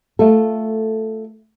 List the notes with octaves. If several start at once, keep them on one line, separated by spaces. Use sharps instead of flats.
A3 F4 A4